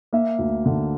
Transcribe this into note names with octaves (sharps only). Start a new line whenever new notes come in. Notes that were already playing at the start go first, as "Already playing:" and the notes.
A#3 E5
D2
D3